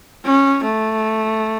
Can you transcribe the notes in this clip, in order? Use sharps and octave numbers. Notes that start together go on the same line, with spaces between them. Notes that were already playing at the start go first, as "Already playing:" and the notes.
C#4
A3